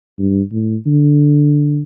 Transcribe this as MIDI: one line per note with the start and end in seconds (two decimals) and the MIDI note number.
0.19 0.41 43
0.52 0.76 45
0.86 1.82 50